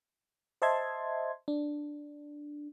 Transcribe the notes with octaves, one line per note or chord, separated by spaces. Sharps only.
C5 D#5 E5 A5 C6 G#6
D4